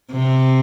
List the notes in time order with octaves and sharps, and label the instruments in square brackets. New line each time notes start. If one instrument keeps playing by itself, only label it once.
[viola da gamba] C3